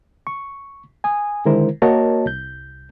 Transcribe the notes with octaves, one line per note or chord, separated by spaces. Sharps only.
C#6
G#5 D#6
D3 D#3 G#3 E4 A#4 C5
A#3 F#4 A#4 C#5 D#5 A5
C2 G6